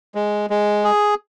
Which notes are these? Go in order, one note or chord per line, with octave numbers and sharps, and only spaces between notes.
G#3
G#3
G#4